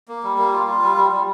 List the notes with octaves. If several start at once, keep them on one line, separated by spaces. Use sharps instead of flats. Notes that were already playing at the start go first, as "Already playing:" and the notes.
A#3
G3
A#3
F4
F4
G3
G3
G3